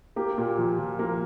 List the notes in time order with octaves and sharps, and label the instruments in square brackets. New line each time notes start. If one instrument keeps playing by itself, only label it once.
[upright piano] A#3 G4
A#2
F3
F3
A#3